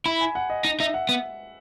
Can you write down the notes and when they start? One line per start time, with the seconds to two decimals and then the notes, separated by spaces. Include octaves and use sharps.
0.06 E4 B5
0.21 G#5
0.35 F#5
0.50 D#5
0.65 D#4
0.80 D#4 E5
0.94 F#5
1.09 B3